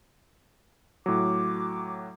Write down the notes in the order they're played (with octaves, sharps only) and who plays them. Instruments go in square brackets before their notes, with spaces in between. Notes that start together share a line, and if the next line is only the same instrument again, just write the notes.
[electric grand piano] A2 F#3 [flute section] D6